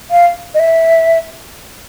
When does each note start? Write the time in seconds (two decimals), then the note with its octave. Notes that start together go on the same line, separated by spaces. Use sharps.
0.11 F5
0.54 D#5
0.59 E5